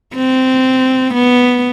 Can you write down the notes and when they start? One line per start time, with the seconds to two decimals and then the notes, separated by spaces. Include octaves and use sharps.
0.15 C4
1.14 B3